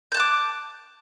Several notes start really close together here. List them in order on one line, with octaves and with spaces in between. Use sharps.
G6 A5 F#6 D6